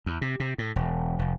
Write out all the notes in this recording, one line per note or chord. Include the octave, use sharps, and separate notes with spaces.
E2
C3
C3
A2
E1
F1